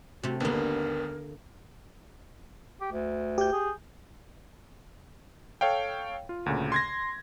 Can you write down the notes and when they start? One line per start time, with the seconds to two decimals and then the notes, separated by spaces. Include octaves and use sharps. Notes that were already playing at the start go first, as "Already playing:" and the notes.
0.23 C3 A3 F#4
0.40 G#1 D#2 D3 A#3 B3 A#4
2.81 G4
2.92 D2
3.38 G4 G6
3.53 G#4
5.61 A4 C#5 F5 G5
6.29 F4
6.46 D2 A#2 C#3
6.72 C6 G#6 A#6